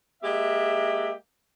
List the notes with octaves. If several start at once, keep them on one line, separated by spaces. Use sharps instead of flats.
G#3 A#3 G4 E5